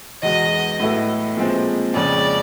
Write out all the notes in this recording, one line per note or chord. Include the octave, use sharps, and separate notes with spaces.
E2 B2 G#3 D#5
A2 F#3 B3 E4 A4
A#2 F3 G#3 C4
F2 C#3 F3 G#3 C#4 D5